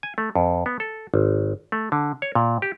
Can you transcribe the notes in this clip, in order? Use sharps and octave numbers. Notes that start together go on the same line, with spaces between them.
G#5
A3
F2
B3
A4
G#1
A3
D3
C#5
A#2
G4